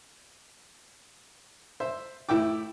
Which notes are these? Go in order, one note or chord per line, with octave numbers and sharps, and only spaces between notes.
C5 E5
A2 E4 E5 G5 D6